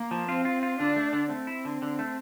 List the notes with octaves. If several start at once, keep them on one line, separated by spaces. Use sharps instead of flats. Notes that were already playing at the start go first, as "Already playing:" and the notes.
Already playing: A#3
F3
C4 F4
F4
F4
D3 D4
A3
D3
A3 C4
E4
D3
D3
A3